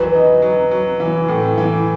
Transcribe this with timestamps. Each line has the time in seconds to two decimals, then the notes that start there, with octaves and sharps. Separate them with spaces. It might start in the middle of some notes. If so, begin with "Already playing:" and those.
Already playing: E3 F#3 B4
0.14 D#4
0.42 F#3
0.71 F#3
1.00 E3
1.28 A2
1.58 E3